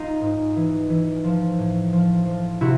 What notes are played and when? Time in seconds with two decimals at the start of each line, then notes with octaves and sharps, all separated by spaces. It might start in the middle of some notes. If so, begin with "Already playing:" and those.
Already playing: D#4 F4
0.21 G#2
0.56 E3
0.90 E3
1.24 F3
1.59 A2
1.93 F3
2.27 F3
2.61 C3 E4 F#4